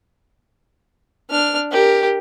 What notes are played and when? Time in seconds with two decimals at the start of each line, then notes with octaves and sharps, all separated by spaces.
1.30 D4 F6
1.71 G4 A#4